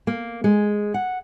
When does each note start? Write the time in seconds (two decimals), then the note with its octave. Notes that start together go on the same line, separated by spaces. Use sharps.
0.07 A#3
0.44 G#3
0.94 F#5